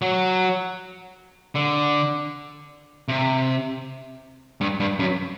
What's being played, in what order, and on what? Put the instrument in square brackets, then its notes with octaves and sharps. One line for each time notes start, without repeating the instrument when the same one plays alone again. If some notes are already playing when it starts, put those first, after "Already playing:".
[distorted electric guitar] F#3
D3
C3
G2
G2
F#2